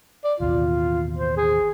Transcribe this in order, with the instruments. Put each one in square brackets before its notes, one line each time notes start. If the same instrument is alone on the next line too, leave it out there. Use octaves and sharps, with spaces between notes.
[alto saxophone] D5
[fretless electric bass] A1 D#2 B2 [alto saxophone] F4
[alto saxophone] C5
G#4